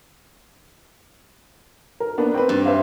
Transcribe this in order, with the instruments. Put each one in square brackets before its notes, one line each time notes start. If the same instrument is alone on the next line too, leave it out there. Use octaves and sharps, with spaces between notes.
[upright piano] A#4
A#3 B3 D4
C4 B4
[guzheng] G2
[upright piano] C5 E5 F5